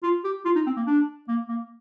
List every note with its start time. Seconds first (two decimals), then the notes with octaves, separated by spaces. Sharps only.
0.03 F4
0.24 G4
0.45 F4
0.56 D#4
0.67 C4
0.77 A#3
0.87 D4
1.28 A#3
1.49 A#3